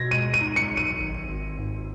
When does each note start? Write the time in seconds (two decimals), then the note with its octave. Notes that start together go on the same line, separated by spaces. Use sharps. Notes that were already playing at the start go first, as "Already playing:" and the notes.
Already playing: B2 G#6 A#6
0.11 G#3 D#7
0.34 D#7
0.41 D#4
0.56 C#7
0.71 B1
0.77 D#7
1.00 G#1
1.29 G#1
1.59 G#2